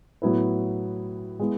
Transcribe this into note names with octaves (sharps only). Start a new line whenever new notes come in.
A2 F#3 B3 E4 B4
G#3 B3 E4